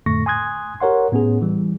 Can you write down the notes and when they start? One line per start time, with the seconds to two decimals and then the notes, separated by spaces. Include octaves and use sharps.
0.06 F2 A2 D3 A3 C#6 A#6
0.26 G#5 C6 D#6 F#6 G#6
0.81 G4 A#4 C#5 F#5 C6
1.12 A2 B3 C#4 G#4
1.42 E3 G3